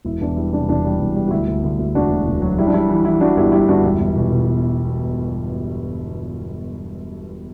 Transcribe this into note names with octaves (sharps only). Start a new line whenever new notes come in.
E1 E4
E2 D4
G3 E4
C3 D4
E1 D4
G3
E1
G3
F#4
D2 E4
D2
D2
D2
E1 D4 F#4
D2
E1
F#3
G3 E4
D4
G3 E4
E3
E3 E4
E3 D4 F#4
G1 E4 G4
G3 E4 G4
G1 D4 F#4
E1 E4
E1
B2
B2